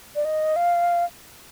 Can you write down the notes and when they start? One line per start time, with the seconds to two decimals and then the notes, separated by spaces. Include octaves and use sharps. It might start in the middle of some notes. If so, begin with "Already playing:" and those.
0.16 D5
0.25 D#5
0.56 F5